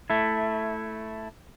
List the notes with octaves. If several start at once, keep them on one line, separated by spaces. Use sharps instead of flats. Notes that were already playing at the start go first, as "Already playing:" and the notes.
A3 E4